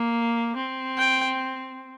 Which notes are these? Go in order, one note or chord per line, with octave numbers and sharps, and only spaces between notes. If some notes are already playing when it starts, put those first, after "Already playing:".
Already playing: A#3
C4
G5